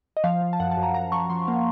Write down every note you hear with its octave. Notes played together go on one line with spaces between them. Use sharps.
D#5
F3 F5
F3
A5
F#2 F#5
A5
F#2
A#5
F#2 A#5
F3 C#6
F3 C6
A#3 F5